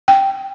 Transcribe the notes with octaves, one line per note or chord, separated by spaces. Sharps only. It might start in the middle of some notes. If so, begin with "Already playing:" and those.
G5